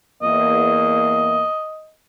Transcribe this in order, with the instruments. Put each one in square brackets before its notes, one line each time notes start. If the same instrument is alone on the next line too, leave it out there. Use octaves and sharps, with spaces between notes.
[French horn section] E2 A#3 [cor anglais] D#5